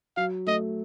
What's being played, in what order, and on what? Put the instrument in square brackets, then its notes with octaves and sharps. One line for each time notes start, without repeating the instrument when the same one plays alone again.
[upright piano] F#3 [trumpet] F5
[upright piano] A3 [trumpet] D#5